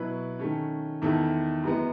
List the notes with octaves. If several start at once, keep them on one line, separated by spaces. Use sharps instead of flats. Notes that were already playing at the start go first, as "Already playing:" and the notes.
Already playing: B2 F#3 B3 E4 B4
D#3 A3 C#4
E2 D#3 A3 E4 A4
F#2 E3 G#3 B3